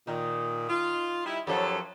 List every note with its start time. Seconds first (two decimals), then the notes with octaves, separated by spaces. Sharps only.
0.07 A#2 D#3
0.69 F4
1.25 G3 D#4 E4
1.47 F#2 F3 F#3 G4 A4